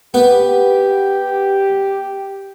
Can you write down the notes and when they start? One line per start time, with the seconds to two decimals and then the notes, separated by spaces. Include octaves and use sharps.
0.14 B3 G4